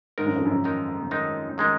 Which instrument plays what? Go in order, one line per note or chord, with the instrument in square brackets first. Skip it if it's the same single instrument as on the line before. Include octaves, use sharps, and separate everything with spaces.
[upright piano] G#2 [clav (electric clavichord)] D#3 G#3 D#4 A#4
[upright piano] F#2
F2
F#2
[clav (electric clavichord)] D#3 G#3 D#4 A#4
D#3 G#3 D#4 A#4
D#3 G#3 D#4 A#4